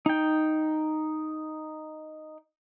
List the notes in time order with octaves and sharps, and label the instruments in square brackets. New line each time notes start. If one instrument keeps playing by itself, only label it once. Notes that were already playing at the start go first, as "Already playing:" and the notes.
[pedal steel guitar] D#4 G5